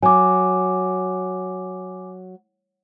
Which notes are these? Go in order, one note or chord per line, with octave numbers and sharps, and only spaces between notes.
F#3 G#5 D6